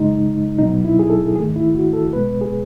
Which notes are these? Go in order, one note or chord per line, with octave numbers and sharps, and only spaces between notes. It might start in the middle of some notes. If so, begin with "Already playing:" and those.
Already playing: F#2 C#3 G#3 D#4
C#2 B2 F#3 B3 D#4
E4
G#4
A4
G#2 D#3 A3 G#4
E4
F#4
A4
C#2 B2 G#3 B3 B4
G#4